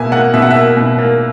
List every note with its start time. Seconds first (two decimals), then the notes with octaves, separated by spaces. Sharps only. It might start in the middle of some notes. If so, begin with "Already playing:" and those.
Already playing: B2 A#3 E5 G#5
0.12 A#3 F#5
0.34 B2 E5
0.42 F#5
0.51 A#3 E5
0.77 B2
0.98 A#3